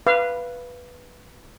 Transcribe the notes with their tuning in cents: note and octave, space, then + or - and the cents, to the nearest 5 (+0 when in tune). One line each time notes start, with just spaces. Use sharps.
B4 -5 F5 -25